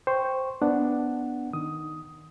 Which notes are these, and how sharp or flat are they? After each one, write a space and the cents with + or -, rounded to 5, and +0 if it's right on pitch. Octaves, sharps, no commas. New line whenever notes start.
C5 +0 G5 +0 C#6 -5
B3 +0 D4 +0 F#5 +0
D#3 +0 D#6 +10